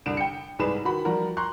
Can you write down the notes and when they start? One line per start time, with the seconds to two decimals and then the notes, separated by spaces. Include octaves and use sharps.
0.06 C2 D3 D7 E7
0.17 G5 C#7
0.59 C2 G#2 G#4 B4 B5 E7
0.85 D#3 F#4 B5
1.05 F3 G3 F#4 A#4
1.37 A#5 C6 C#6 F#6